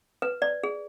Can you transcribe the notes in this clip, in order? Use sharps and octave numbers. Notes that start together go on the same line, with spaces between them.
B4
D5
G#4